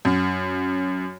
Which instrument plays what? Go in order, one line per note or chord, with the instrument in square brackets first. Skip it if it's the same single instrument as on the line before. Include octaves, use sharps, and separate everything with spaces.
[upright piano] F#2